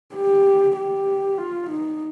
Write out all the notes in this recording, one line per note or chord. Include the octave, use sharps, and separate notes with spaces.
G4
G4
F4
D#4